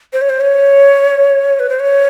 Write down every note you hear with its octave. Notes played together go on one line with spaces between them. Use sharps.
C5
C#5
C5
C#5
B4
C5
C#5